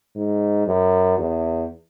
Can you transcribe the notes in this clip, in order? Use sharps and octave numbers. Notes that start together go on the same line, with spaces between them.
G#2
F#2
E2